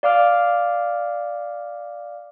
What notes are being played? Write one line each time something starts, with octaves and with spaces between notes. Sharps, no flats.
D5 F5 D6 F6